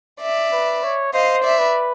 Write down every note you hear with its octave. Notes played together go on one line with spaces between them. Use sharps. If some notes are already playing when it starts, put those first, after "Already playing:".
D5 E5
B4
C#5
C5 D#5 F5
D5 E5
B4